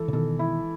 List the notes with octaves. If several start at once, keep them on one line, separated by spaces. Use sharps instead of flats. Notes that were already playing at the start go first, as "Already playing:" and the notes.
Already playing: E3 A4
C#3
B2 D#3 A4
E4